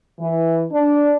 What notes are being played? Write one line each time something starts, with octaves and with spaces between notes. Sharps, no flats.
E3
D4